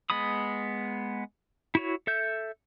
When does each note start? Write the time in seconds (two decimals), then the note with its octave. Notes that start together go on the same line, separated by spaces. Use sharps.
0.10 G#3 B3 B5 D#6
1.75 E4 F#4 C#5
2.07 A4 E5 G6